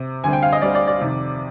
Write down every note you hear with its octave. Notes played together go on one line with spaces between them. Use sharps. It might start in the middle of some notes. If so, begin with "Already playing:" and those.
Already playing: C3 C4
D2 D3 G3 C4 G#5
G5
F5
D#5
D2 D3 G3 C4 D5
D5
D5
F2 C3 D#3